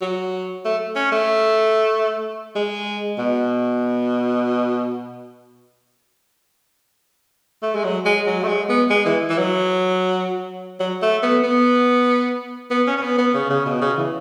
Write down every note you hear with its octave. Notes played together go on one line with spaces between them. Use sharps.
F#3
A3
C#4
A3
G#3
B2
A3
G#3
F#3
G#3
F#3
A3
G#3
B3
G#3
E3
E3
F#3
F#3
A3
B3
B3
B3
C#4
C#4
B3
B3
C#3
C#3
B2
C#3
E3